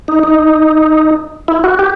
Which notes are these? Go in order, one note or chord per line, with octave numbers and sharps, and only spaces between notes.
D#4
D#4
E4
F#4
G4